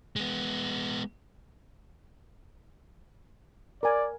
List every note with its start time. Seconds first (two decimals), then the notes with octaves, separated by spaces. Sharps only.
0.16 G#3 B3
3.83 A#4 D5 G#5